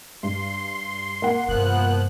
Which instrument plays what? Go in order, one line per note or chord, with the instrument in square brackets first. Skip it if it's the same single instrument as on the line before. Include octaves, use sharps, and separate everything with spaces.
[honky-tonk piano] G2 [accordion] C6
[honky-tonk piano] A#3 F#5
[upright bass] G2 C3 [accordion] F3 B3 F#6